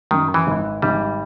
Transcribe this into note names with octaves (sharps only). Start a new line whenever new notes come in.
F#2 D#3
E3
G#1
G#1 G3